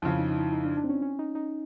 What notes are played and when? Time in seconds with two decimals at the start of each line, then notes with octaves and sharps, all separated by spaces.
0.02 F2 C#3 F3 E4
0.19 D#4
0.31 D#4
0.36 E4
0.53 D#4
0.65 D4
0.77 D4
0.84 C4
0.89 C#4
1.02 C#4
1.19 D#4
1.35 D#4